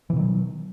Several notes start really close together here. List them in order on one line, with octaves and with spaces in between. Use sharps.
E3 B2 D#3 F#3